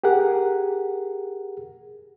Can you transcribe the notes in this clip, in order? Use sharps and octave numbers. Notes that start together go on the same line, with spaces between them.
G4 G#4 A#4 F#5